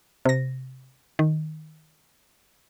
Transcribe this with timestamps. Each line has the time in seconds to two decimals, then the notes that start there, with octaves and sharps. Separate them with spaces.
0.25 C3 A#6
1.19 D#3